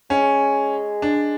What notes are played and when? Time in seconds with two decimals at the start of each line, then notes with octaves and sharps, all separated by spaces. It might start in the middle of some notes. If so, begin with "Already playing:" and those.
0.10 G#3 C#4
1.02 D4